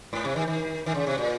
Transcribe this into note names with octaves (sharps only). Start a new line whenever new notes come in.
G#2
C3
D#3
D#3
D#3
C#3
C3
A#2